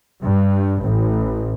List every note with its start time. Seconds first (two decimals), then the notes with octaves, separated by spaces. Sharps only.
0.24 G2
0.83 A1